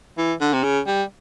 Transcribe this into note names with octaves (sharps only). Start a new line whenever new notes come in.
E3
D3
C3
C#3
G3